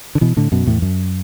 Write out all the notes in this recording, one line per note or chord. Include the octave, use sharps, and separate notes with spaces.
D3
B2 E3
A2 D3
F#2 B2
E2 A2
F#2